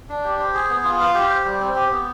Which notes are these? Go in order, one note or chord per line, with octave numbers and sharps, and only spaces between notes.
D4
G4
C5
G#4
B3
F4
F5
G4
C5
G3
C4
G4
B3